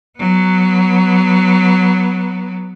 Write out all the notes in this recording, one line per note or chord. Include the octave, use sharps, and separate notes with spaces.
F#3 B3